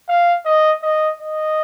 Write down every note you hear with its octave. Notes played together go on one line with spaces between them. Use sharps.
F5
D#5
D#5
D#5